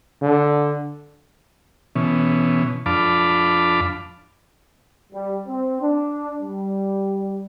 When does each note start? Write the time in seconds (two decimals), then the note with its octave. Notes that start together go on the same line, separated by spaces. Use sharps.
0.22 D3
1.96 B2 E3 C#4
2.86 F2 D4 F5 A5 B5 D6
5.13 G3
5.47 C4
5.82 D4
6.41 G3